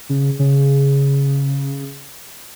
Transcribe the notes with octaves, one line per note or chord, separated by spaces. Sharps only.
C#3
C#3